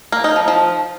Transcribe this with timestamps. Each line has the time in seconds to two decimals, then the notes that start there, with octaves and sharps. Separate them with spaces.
0.12 A#3
0.24 D#4
0.36 F3
0.48 F3